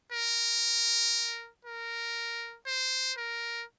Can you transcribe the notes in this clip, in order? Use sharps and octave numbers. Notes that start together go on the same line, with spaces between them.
A#4
A#4
C5
A#4